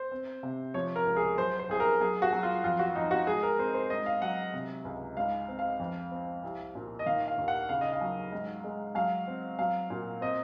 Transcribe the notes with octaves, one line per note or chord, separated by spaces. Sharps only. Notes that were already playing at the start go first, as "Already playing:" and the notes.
Already playing: C5
C4
C3
F3 C#5
A#4
C#2
G#4
F#3 C5
C5
C2 G#4
A#4
F#3 G#4
F#4
F#3
F4
F2 F4
F#4
F2 D#4
F#4
G#2 G#4
A#4
C4 C5
C5
G#2 D#5
F5
F#3 F#5
C3
C#2
G#2 F5
C4
F5
F2
C4
C2
A#2
D#5
D#3 F5
F5
D#2
F#5
C#3 F5
D#5
F5
F#3
G#2
G#3
F#3 F5
C4
F#3 F5
A#2
C4 D#5